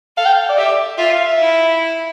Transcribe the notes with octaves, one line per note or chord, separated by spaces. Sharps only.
A4 F5
G5
F5
D5
G4 E5
F4 E5
F5
E5
E4